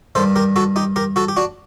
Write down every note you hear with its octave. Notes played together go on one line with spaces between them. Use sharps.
G2 D#3 A4 C5
G4 A#4
F#4 A4
D#4 G4
G4 A#4
F#4 A4
G4
D4 F#4